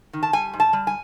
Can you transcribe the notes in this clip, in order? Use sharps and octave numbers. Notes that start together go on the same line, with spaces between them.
D#3
A5
G3 G#5
G#2
A5
G3
G#5